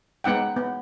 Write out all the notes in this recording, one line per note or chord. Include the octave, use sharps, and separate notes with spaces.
G#3 B3 D#4 F#5 G5
B3